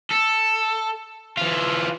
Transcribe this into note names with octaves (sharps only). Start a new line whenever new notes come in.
A4
E3 F4